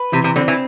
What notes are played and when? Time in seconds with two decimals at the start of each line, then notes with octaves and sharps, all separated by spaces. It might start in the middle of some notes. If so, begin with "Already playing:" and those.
Already playing: B4
0.12 C3 E3
0.24 C3
0.36 D3 C4
0.48 E3